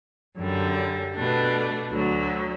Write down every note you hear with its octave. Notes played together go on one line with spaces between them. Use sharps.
F#2 D3 G3
B2 A3 D4
D2 D3 F#3